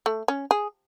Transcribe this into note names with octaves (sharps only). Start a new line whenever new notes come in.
A3
C#4
G#4